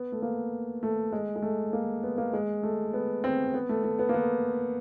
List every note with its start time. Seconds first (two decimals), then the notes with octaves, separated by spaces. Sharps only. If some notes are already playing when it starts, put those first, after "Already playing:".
Already playing: B3
0.12 A3
0.22 A#3
0.83 A3
1.12 G#3
1.36 G#3
1.42 A3
1.73 A#3
2.03 B3
2.18 A#3
2.33 G#3
2.63 A3
2.94 B3
3.24 C4
3.54 B3
3.69 A3
3.84 A3
3.99 B3
4.09 A#3
4.14 B3